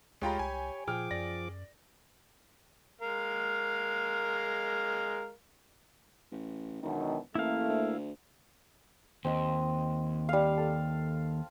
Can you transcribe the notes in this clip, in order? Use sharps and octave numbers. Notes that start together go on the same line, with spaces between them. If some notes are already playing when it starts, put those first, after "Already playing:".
D2 G#3 F4 G4 C#5 G5 A#5 B5
C2 G#5
A#2 F3 G#4 G5 D6 F6
F#2 D5 A#6
G#3 A#4 F5
A1
E1 F#2 B2 D#3
A1 A3 A#3 E4 F5
D2
D#2 C4 D#5
G3 F5
A4